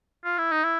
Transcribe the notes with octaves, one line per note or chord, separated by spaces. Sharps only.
F4
E4
D#4
E4